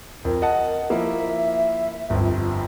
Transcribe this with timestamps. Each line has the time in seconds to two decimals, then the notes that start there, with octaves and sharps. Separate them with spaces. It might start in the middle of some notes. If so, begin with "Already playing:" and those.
0.25 F2 A#4
0.42 D#5 F#5 A5
0.90 F3 A#3 E4 E5
2.10 G1 F2